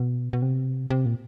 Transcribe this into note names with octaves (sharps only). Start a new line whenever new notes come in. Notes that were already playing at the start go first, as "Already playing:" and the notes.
Already playing: B2
B2
C3
C3
A#2